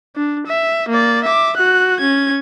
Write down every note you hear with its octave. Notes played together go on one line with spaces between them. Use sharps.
D4
E5
A#3 D5
E5 D6
F#4 F#6
C#4 G#6